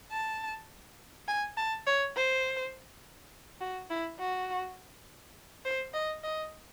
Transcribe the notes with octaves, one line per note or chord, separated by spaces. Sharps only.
A5
G#5
A5
C#5
C5
F#4
E4
F#4
C5
D#5
D#5